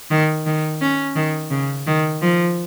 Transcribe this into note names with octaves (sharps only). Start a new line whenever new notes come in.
D#3
D#3
C#4
D#3
C#3
D#3
F3